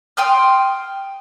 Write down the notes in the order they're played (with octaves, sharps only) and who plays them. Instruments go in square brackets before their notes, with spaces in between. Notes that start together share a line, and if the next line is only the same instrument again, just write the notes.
[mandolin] G5 C6 D#6 F6